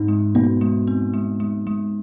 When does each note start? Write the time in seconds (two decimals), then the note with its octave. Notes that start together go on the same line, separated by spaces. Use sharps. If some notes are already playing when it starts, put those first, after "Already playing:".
Already playing: G#2 C4 D#4
0.08 G#3
0.35 B2 D#4
0.61 G#3
0.87 C4
1.14 G#3
1.40 G#3
1.67 G#3